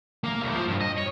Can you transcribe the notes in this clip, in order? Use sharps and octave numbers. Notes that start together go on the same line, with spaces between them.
A#3 F5
C2 A2
F3
G2
D#5
C#5